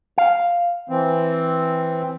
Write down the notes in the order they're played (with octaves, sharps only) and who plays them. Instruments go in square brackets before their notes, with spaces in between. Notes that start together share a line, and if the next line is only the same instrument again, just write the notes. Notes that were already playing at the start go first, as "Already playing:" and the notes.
[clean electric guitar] F5
[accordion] E3 C4